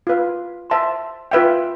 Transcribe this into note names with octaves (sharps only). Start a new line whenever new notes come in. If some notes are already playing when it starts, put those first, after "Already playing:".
F4 B4 F5
C5 E5 A5 C6
F4 B4 E5 G5